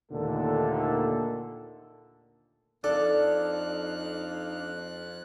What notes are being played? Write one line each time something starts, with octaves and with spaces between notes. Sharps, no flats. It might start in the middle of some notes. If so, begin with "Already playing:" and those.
D#2 A#2 D3 D#3 A3 A4
F2 D4 D#4 A4 D5 F5 F#6